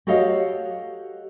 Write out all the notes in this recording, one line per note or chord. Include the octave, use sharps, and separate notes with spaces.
F#4 G4 A4 C#5 D#5 F5